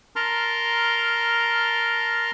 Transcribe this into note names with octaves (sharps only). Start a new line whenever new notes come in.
A#4 A5 A#5 C6 F6